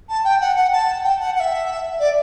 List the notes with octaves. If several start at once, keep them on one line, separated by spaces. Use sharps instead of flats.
A5
G5
F#5
F#5
A5
G5
F#5
F#5
E5
D5